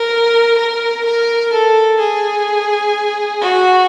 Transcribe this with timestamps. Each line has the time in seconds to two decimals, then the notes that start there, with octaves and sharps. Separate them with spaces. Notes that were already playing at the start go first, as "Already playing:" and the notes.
Already playing: A#4
0.58 A#4
1.05 A#4
1.52 A4
1.99 G#4
3.41 F#4